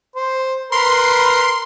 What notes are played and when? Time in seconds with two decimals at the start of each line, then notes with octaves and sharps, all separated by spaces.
0.15 C5
0.72 A#4 B4 B5 C6